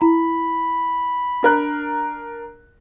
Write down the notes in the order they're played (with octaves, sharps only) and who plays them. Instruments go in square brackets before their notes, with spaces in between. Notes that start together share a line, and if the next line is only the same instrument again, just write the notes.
[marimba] E4 A#5 [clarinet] B5
[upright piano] D4 A#4 F#6